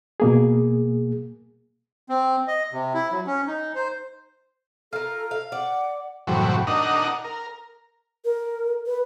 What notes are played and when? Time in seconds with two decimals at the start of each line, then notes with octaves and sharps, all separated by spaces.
0.20 B2 A#3 G#4
2.09 C4
2.48 D#5
2.72 C3
2.94 E4
3.11 F#3
3.27 C#4
3.47 D#4
3.75 C5
4.93 F4 A4 A#4
5.31 F5
5.52 D5 F#5
6.27 F#2 A2 C3 E3 F#3 G3
6.67 D4 D#4 A#4 D#5 F#5
7.24 A#4
8.25 A#4
8.86 B4